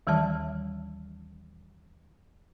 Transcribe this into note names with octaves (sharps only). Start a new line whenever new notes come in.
D#2 D#3 E3 G3 E5 A5